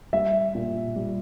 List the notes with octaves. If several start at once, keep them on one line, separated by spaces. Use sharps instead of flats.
G3 E5
A#2
G3